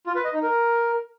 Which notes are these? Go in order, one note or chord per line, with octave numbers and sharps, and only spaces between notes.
F4
B4
D#5
D#4
A#4